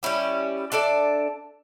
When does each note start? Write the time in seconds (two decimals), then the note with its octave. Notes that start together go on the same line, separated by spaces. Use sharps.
0.03 G3 C#4 E4 G4
0.72 D4 A4 D5 E5